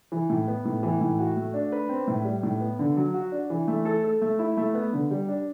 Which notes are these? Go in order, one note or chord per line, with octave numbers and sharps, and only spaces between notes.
E3
A2
B3
A2
E3
A2
F#4
A3
D4
B4
C4
A2
G3
A2
B3
D3
F#3
F#4
D4
E3
A3
A4
A4
A3
E4
A3
B3
D3
G3
D4